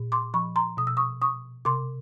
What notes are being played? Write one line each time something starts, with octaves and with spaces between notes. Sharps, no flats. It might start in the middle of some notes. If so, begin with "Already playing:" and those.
Already playing: A#2
C6 D6
F3 B5 C#6
A#5 C6
B2 D#6
E6
C#6 D#6
C#6 D#6
C3 C6 D6